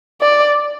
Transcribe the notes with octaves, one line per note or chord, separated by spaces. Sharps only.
D5